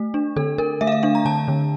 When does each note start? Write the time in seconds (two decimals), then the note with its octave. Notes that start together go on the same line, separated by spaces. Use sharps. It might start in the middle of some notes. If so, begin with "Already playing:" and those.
Already playing: A3
0.14 D4
0.36 D3 A4
0.58 D3 A#4
0.81 A3 E5
0.87 F5
0.92 E5
1.03 D4 F5
1.15 A#5
1.25 D3 A5
1.48 D3